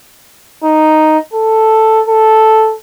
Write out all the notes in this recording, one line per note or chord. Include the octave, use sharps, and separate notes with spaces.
D#4
A4
A4